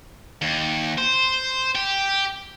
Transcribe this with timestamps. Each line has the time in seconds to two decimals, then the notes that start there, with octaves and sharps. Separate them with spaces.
0.42 D#2
0.98 C5
1.75 G4